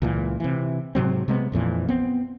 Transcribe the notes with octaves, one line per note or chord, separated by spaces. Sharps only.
C#2 A#2 E3
C3 E3
G#2 C3 F#3 C4
C3 G#3 A#3 B3
A#1 F2 A#2 E3
B3 C4